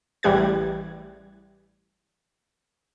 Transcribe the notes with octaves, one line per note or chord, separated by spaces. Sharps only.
A1 E3 G3 G4 F#6 G#6